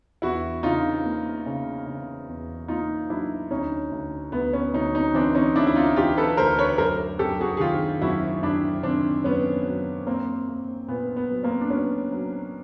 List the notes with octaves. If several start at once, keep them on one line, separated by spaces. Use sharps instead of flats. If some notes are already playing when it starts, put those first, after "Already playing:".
E2 E4 F#4
C#3 D#4 F4
A#3
C#3
C#3
E2
A#3 D#4 F4
F#3 D4 E4
D2 C#4 D#4
D2
D2 B3
B3 C#4
D2 C#4 D#4
C#4 D#4
E3 C4 D4
C#4 D#4
D2 D4 E4
E4
D#4 F4
E3 F4 G4
A4 B4
D2 A#4 C5
B4 C#5
F#2 A#4 C5
F#2 G4 A4
F#4 G#4
G#4
D#3 F4 G4
F#2 E4 F#4
F#2 D4 E4
D#3 C4 D4
F#2 B3 C#4
F#3
A#3 C4
A#3
A#2 B3
B3
F#3
A#3 C4
D4
F#3 B3 C#4
F#3